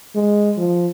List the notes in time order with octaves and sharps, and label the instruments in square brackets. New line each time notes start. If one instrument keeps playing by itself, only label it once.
[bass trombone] G#3
F3